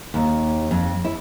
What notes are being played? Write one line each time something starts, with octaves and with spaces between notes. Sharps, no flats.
D#2
F2
E4